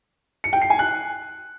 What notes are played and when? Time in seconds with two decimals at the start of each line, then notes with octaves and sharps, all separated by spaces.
0.44 C#7
0.53 G5
0.62 C7
0.70 G#5
0.79 F#6